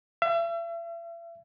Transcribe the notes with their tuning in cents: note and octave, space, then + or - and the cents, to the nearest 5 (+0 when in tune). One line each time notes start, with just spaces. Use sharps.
E5 +40